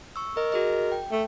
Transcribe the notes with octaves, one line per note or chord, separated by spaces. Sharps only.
C#6 E6
A#4 D#5
F#4 G#4 D#5
G5
A3